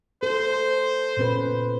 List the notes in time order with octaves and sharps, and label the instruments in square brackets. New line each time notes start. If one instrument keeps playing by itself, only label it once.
[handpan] A4 [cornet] C5
[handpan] A#2 C#4 B4